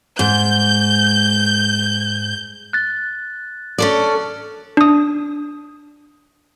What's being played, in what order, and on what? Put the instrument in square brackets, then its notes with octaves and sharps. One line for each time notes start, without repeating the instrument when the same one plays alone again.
[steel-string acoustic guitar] G#2 [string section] G6
[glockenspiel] F#6 A6
[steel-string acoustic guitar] C#4 A4 D5
[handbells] D4 D#6